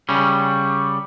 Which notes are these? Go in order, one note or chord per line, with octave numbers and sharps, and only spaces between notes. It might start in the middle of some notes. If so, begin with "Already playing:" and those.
C#3 G3 C#4
C#6